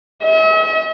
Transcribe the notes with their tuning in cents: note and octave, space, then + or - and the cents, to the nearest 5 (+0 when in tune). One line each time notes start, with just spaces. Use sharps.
E5 -45